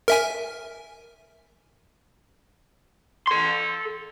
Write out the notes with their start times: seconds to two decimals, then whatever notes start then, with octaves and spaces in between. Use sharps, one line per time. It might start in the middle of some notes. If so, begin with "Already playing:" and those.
0.08 A#4 E5 G#5
3.27 A4 C6